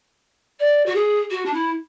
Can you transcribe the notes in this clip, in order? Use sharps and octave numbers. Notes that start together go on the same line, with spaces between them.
D5
F#4
G#4
F#4
D4
E4